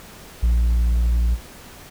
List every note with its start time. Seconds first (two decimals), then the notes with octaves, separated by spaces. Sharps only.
0.42 A#1